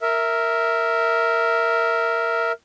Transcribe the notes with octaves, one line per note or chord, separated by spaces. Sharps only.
A#4 E5